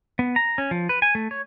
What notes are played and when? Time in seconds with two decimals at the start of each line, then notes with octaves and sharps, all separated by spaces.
0.19 B3
0.36 A#5
0.58 C#4
0.71 F3
0.89 B4
1.02 G#5
1.15 A3
1.31 C#5